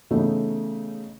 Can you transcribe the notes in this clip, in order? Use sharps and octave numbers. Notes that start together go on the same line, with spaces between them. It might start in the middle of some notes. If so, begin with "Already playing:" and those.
C#3 E3 A3 B3 D4 D#4